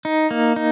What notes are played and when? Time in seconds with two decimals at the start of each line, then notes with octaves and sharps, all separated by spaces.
0.05 D#4
0.31 A#3
0.56 D#4